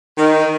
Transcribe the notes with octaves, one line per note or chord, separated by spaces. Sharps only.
D#3